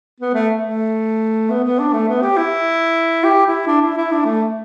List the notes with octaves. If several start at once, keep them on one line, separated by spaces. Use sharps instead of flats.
B3
A3
A3
B3
B3
D4
A3
B3
G4
E4
G4
E4
D4
E4
E4
D4
A3